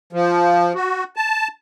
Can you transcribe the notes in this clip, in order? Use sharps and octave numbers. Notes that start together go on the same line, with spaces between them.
F3
F#4
A5